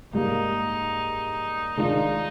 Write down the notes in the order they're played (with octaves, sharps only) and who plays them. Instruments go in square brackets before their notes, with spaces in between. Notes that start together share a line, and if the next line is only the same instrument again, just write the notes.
[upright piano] G#2 G3 A#3 [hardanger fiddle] D#4
[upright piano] D#3 G#3 D4 F4 [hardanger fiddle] D#4